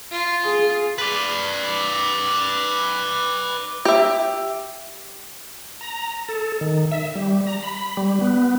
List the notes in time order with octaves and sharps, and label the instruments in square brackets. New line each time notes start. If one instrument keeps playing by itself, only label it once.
[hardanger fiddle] F4
[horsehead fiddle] G#4
[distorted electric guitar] B4 D5
[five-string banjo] G4 E5
[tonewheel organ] A#5
A4
D#3
E5
G3
A#5
B5
G3
B3